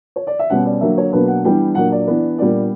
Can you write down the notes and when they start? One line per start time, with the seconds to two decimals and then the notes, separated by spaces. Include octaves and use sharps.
0.16 C#5
0.27 D5
0.39 E5
0.50 B2 G3 C#4 F#5
0.66 D5
0.81 D3 F#3 A#3 E5
0.98 C#5
1.13 B2 F#3 A#3 D4 B4
1.28 F#5
1.44 E3 G3 B3 D4 G5
1.75 A#2 F#3 A#3 D4 F#5
1.92 D5
2.07 E3 B3 D4
2.38 A#2 G3 B3 D4 D5